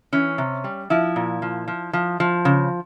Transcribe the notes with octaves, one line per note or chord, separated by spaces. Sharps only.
E3 C#4
C3
G3
F3 E4
A#2
F3
F3
F3
F3
C#3